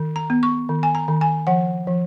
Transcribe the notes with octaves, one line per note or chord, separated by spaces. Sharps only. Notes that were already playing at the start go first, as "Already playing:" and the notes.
Already playing: D#3
A#5
B3
C#6
D#3
G#5
A#5
D#3
G#5
F3 F#5
F3